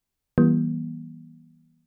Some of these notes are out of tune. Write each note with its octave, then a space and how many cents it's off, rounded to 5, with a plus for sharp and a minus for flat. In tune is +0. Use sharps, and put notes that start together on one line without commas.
E3 -25 G3 -30 A#3 +45